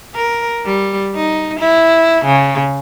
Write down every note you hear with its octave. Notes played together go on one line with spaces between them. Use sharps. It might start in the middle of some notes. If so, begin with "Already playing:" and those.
A#4
G3
D#4
E4
C#3